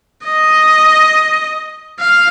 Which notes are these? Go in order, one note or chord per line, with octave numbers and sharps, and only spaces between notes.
D#5
F5